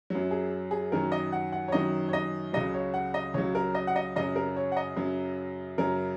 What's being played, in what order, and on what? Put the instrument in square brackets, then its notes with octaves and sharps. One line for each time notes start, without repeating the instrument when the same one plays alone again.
[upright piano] F#2 F#3
G#4
G#4
F#2 D#3 F#3 A#4
D#5
F#5
F#5
C#5
F#2 D#3 F#3 D#5
C#5
D#5
C#2 C#3 F#3 D#5
C#5
F#5
D#5
C#2 C#3 F#3 C#5
A#4
D#5
F#5
D#5
F#2 C#3 F#3 D#5
A#4
C#5
F#5
D#5
F#2 C#3 F#3
F#2 C#3 F#3 A#4